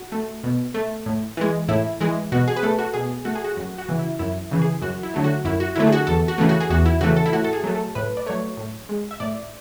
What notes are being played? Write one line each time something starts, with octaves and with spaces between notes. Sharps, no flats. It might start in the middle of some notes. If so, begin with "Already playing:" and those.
Already playing: F#4
A3
B2
A3
A2
E3 G#3
A2 E4
E3 G#3
B2 F#4
G#4
B4
A3 A4
F#4
B2 G#4
A3 F#4
G#4
F#4
F#2 F#4
F#4
C#3 E3
E4
F#2 E4
C#3 E3
G#4
F#2 F#4
E4
D3 F#3 A3
F#4
F#2 E4
F#4
D3 F#3 A3 E4
G#4
F#4
E2 A4
F#4
C#3 E3 A3
F#4
G#4
E2 F#4
E4
C#3 E3 A3 F#4
A4
E4
A2 F#4
A4
G#4
F#3 A3
A4
A2 B4
D5
F#3 A3 C#5
A2
G#3
E5
A2 D5